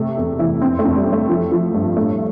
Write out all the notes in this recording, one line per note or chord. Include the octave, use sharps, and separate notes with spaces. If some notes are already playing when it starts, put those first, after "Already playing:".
Already playing: C3 A3
E2
E3 E4
F2 C4
A3
F2
G3
F2
A3
F3
F3
G2
A2 A3